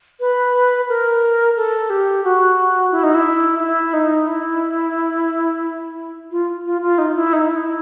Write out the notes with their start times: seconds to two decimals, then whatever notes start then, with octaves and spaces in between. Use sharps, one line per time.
0.20 B4
0.89 A#4
1.57 A4
1.90 G4
2.24 F#4
2.92 E4
3.03 D#4
3.15 E4
3.59 E4
3.93 D#4
4.27 E4
6.31 F4
6.66 F4
6.82 F4
6.98 D#4
7.16 E4
7.33 D#4
7.50 E4